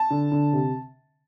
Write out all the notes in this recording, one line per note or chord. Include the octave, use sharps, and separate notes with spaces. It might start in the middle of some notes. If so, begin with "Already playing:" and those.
Already playing: A5
D3
D3
C3